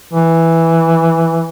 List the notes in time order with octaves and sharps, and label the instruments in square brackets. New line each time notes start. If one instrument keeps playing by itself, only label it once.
[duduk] E3